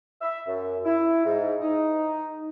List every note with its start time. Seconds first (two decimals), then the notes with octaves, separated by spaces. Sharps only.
0.22 E5
0.47 F#2
0.85 E4
1.25 G#2
1.62 D#4